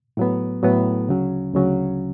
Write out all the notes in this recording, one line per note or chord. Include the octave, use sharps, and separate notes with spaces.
A2 F#3 B3
A2 F#3 B3
D2 C#3 F#3 C#4
D2 C#3 F#3 C#4